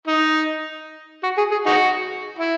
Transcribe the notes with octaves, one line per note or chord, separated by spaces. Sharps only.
D#4
F#4
G#4
G#4
D#4 F#4
E4